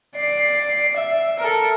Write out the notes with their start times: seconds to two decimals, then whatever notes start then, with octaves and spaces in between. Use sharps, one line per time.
0.16 D5 C7
0.97 E5
1.39 A4 A#4